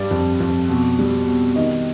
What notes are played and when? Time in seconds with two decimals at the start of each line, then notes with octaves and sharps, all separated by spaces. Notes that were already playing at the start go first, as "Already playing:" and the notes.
Already playing: G2 G3 D5
0.11 F2
0.40 F2
0.69 B2
0.99 G3
1.27 B2
1.56 D#3 D#5